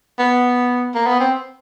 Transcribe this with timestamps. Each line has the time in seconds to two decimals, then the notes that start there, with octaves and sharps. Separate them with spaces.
0.19 B3
0.95 A#3
1.07 B3
1.20 C4